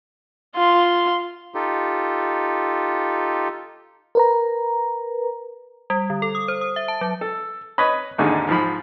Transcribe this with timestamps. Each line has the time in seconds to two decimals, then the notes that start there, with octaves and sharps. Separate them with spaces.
0.56 F4 C6
1.55 D#4 F4 G4 A4
4.15 A#4 B4 A#5
5.90 G3
6.10 D3
6.22 A4
6.35 D#6
6.48 C5
6.61 D#6
6.76 E5
6.88 A5
7.01 F#3
7.21 A4
7.78 B4 C#5 D#5 B5
8.18 A1 D#2 G#2 D3 D#4 G#4
8.49 G#2 F3 B5